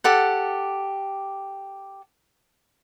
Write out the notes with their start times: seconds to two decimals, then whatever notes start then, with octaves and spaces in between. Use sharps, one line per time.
0.04 G4 A4 F#5